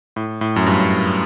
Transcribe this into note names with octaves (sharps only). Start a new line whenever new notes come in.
A2
A2
F#2
G2